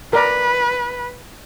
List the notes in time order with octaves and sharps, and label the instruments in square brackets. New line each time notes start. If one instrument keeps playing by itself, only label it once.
[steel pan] A#4 D5 [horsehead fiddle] B4